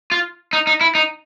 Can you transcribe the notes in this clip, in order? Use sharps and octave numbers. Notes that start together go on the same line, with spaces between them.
F4
D#4
D#4
E4
D#4